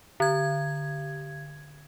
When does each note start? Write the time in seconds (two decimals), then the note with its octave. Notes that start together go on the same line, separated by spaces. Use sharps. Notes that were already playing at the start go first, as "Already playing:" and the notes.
0.20 D3 G#6